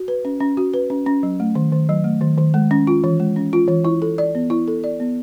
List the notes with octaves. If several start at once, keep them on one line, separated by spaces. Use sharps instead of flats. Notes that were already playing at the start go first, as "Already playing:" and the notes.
Already playing: F#4
B4
C#4
C#4
F#4
B4
C#4
C#4
F#3
A3
D#3
D#3
F#3
A3
D#3
D#3
G#3
C#4
F4
E3
G#3
C#4
F4
E3
E4
A4
D5
B3
E4
A4
D5
B3